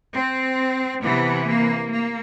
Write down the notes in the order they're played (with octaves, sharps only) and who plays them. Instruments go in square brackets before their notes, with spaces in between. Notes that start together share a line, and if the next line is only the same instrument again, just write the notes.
[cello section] C4
C3 E3 B3
A#3
A#3